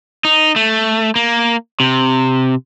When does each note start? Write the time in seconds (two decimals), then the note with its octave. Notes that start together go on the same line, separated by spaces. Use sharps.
0.25 D#4
0.56 A3
1.16 A#3
1.80 C3